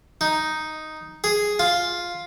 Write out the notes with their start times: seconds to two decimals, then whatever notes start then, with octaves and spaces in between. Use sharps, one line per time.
0.21 D#4
1.24 G#4
1.59 F4